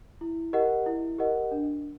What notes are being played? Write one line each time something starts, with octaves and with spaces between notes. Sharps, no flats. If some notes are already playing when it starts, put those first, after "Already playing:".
E4
G4 A#4 D#5 F#5
E4
G4 A#4 D#5 F#5
D4